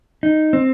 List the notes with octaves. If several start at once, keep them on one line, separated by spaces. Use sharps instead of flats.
D#4
C4